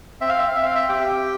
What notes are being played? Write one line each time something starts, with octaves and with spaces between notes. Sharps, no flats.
C4 E5
F5
E5
F5
C4 E5
F5
E5
G4 G5